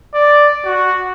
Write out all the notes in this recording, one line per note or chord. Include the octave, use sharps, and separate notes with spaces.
D5
F#4